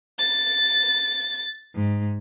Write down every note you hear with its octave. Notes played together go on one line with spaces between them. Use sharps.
A6
G#2